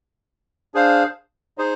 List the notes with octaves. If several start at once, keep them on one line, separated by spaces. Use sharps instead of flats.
D4 G#4 C5 F5
D#4 G#4 C5